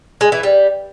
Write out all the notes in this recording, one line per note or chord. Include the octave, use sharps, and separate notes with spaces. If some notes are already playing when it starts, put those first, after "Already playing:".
G#3
E3
G3